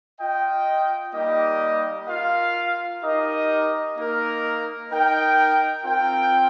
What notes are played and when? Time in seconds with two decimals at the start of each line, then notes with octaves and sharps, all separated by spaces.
0.20 F4 D#5 G5
1.13 G3 A#3 D#4 G4 D#5
2.08 F4 A#4 F5
3.02 D#4 G4 A#4 D#5
3.95 A#3 D#4 A#4
4.90 D#4 A#4 G5
5.84 C4 F4 A#4 G5